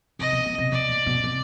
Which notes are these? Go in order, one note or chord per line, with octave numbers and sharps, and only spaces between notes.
C3 D#5
B2
B2
C3
B2 D5
A#2
B2
C3